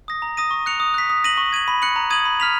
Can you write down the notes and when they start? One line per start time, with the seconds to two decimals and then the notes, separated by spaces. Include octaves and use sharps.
0.08 D#6 A#6
0.22 A#5
0.37 D#6 A#6 D#7
0.51 C#6
0.66 F#6 C#7 F7
0.80 D#6
0.94 F#6 B6
1.10 D#6
1.24 A#6 D#7 F#7
1.38 C#6
1.53 G#6 D#7 F#7
1.68 B5
1.82 F#6 C#7 F#7
1.96 A#5
2.10 D#6 G#6 D#7 F#7
2.26 B5
2.40 F6 B6 F7